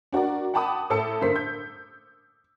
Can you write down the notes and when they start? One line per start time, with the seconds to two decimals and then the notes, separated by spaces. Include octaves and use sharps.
0.12 D4 F#4 A#4 D5
0.54 F#5 G5 A5 B5 D6 D#6
0.90 A2 A4 A5 E6 C#7
1.21 G2 D3 A#3 C5 C6 B6
1.36 G6